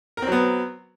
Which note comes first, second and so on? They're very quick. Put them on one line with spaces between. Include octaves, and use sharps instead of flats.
A#4 C4 F#3 B3